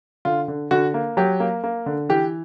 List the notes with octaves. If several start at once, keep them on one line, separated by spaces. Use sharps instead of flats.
D3 F4
D3
D3 F#4
A#3
F#3 G4
A#3
A#3
D3
E3 G4